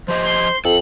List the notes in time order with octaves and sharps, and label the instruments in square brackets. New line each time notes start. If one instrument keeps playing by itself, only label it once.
[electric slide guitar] F3 G4 D#5 [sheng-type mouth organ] C5
[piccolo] C6
[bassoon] F2 [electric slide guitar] A4 [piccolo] F#7